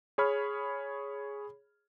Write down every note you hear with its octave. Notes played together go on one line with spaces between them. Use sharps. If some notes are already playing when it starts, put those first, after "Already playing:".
G#4 C#5 B5 F6